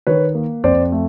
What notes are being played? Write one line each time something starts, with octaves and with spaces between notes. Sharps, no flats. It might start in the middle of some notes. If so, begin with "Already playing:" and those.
D#3 B4 C#5
A#3
F2 C5 D5
A3